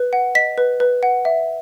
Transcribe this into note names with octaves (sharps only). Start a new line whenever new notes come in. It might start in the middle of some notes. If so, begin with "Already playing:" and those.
Already playing: B4
F#5
D#5 B6
B4
B4
F#5
E5